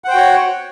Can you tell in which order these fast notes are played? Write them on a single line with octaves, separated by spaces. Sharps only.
F#5 C5 G5 F#4 C#5